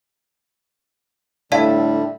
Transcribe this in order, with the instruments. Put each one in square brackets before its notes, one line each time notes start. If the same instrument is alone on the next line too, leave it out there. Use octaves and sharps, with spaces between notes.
[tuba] A2 [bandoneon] D3 G3 [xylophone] D5 F5 A5 [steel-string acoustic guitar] E5